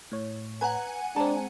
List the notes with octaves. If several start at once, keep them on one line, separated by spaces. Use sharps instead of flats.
A2 C#5
B4 F#5 G#5 A#5
G#3 C4 D4 A5 A#5